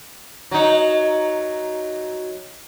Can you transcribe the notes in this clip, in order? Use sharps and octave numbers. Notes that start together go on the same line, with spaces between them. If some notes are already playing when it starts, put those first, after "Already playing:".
F#3 D#4